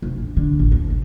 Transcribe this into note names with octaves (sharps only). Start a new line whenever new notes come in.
F1
A#1
D3
A1
D2
C3